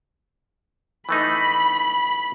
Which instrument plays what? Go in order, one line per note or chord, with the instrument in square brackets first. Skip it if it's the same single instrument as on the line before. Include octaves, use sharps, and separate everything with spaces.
[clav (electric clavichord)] E3 A3 D#4 [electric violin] B5